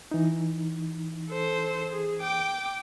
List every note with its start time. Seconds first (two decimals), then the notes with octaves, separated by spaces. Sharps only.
0.11 E3 D#4
1.29 A4 C5
1.91 G#4
2.21 G5 D6